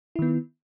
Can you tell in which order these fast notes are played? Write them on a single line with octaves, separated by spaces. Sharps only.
E4 D#3 B3